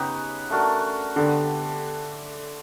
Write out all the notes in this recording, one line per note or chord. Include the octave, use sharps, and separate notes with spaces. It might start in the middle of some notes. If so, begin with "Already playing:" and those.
Already playing: C#3 B3 D#4 G4 B4 C#5
A3 D4 F#4 A#4
D3 G3 B3 D4